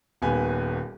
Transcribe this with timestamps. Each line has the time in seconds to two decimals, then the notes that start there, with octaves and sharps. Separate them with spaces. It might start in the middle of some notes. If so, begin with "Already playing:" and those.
0.22 D#1 D#2 B3 G#5